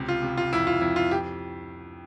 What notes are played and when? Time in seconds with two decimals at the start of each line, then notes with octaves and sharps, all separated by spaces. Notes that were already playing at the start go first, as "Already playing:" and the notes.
Already playing: C#2 C3
0.08 F4
0.23 C3
0.37 F4
0.53 F2 E4
0.67 F4
0.81 F2 E4
0.96 F4
1.11 G4